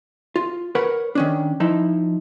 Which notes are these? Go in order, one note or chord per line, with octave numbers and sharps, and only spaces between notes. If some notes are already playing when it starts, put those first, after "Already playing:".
F4
A#4 B4 C#5 F#5 B5
D#3 C#4 D4
F3 D#4 E4